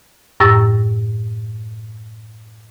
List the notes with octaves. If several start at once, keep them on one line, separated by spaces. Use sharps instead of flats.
F#2 A2 C#6 E6 A6 A#6